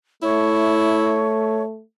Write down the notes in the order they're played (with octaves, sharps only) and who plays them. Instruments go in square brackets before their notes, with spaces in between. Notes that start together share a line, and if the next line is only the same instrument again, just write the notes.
[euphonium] A3 [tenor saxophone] E4 [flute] C#5